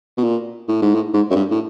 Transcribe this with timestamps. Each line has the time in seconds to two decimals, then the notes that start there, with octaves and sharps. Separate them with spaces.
0.18 B2
0.23 A#2
0.68 A2
0.82 G#2
0.95 A2
1.14 G#2
1.30 F#2
1.36 G2
1.51 A2